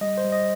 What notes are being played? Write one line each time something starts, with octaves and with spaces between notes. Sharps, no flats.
G3 D#5
C5
G3
D#5